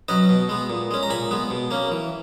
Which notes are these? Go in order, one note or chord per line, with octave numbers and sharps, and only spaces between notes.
F#3 C#4 B4 D#5
B2
G#3 B3
A#2
G#3 C#4
A#5
A#2 G#5 B5
G#3 B3
B2
A#3 C#4
E3